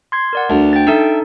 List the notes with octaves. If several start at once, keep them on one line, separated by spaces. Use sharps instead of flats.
C6 G#6 C7
A#4 D5 F#5
D2
G5 A6
D4 D#4 A4 E5